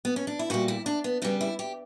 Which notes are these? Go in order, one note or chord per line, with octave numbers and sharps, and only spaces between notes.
B3
C#4
D4
E4
A#2 G3 F#4
E4
D4
B3
C#3 G3 B3
E4
G4